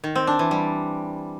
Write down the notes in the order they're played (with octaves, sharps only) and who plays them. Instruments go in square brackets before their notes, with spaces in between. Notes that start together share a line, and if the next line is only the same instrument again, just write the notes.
[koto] D#3
C4
D4
E3
G3